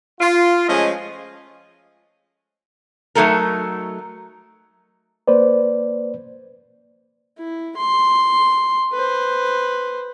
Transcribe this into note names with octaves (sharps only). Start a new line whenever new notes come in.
F4
F3 G#3 A3 C#4 G#4 D#5
F#3 A3 D#4 A4 A#4
A#3 B4 C5 D5
E4
C6
B4 C5